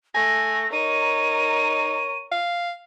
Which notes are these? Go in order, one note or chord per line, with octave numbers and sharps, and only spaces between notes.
A3 G#5 A#6
D#4 A#4 C#5 D#7
F5